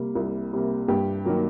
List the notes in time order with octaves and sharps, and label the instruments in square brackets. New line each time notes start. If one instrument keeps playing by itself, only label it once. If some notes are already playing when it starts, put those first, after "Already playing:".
Already playing: [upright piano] C3 G3 A#3
C2
C3 G3 A#3
G2 G4
D#3 F#3 A#3